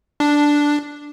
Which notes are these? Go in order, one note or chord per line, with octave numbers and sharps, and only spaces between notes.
D4